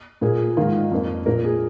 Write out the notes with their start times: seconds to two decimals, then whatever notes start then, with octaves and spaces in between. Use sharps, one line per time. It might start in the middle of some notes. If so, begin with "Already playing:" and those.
0.21 A#2 A#3 G#4
0.57 G#2 D#3 A#3 F4
0.91 F2 F3 A#3
1.26 A#2 A#3 A#4
1.44 G#4